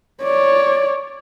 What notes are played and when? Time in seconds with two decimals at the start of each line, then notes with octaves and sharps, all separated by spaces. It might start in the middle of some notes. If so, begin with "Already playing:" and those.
0.23 C#5 D5